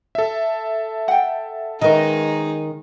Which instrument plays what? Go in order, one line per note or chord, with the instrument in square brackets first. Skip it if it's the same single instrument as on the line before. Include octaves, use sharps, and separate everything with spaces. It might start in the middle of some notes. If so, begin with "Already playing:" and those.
[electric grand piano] A4 E5
[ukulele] F#5 G5
[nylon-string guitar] D#3 A#4 [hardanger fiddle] G#3 D#4 [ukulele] C#4 B4 D#5